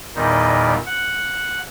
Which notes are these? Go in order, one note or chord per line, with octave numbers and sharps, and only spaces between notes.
E2 A#2 D#3 G3 D#4
F#5